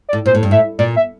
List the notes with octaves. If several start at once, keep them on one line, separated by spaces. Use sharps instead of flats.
D5
A2
A#2 C5
A2
G2
A2 E5
A#2 D5
E5